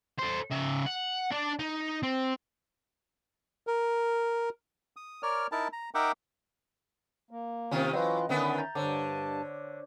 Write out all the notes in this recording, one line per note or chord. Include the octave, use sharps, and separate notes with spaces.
A4 C5
C#3 E5
F#5
D4 D5
D#4
C4
A#4
D#6
A#4 C#5 D5 F6
D#4 E4 A#4 A5
A#5
D#4 A#4 E5 F#5 G5 D6
A#3
C3 D#3 C#4 F4 C5
E3 F#3 F4 B4 D#5
D3 D#3 B3 C#4 B4 E5
A#5 G6 A6
G2 D3 C5 C#5 A5 D6